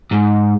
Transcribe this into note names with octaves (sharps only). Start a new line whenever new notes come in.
G#2